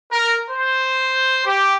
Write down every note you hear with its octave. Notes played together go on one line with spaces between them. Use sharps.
A#4
C5
G4